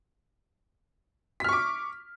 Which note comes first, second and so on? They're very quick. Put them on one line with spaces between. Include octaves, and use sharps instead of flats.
B6 F6 C#6 D6